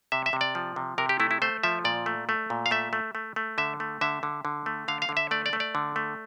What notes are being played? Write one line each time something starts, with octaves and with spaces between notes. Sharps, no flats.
C3 E5
E5
C3
D5
F3
C3
C3 A#4
G4
A3 E4
E4
A3 C5
F3 E5
A#2 D5
A3
A3
A#2
F5
A3 E5
A3
A3
A3
D3 E5
A3
D3 E5
D3
D3
A3
D3 F5
F5
D3
E5
A3 D5
D5
A3
D5
D3
A3